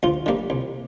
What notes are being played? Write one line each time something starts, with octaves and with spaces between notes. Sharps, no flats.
D2 F4
D3 G3 A#3
C2